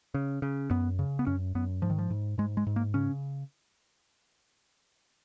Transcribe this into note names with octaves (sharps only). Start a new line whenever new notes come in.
C#3
C#3
F#2 B3
C#3
B3
F#2 C#4
F#2 B3
G#2 F3
D#3
F3
G#2
G#2 G#3
G#3
G#2
A#3
C#3 C#4